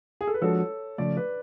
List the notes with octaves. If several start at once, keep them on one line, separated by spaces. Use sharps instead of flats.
G#4
A4
B4
F3 G#3 D4 F#4 A4 C#5
C#3 F3 A3 D5
B4 D5